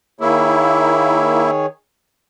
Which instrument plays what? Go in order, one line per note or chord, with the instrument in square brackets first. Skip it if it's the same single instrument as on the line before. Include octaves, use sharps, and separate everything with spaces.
[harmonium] D#3 G#4 C#5 [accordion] A#3 E4